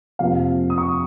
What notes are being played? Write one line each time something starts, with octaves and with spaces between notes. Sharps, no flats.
F2 C3 F3 A#3 F5
D#6
C#6